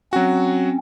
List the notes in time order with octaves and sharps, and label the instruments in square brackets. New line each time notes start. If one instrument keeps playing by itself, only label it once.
[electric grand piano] F#3 F#4 [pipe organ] C4 C#4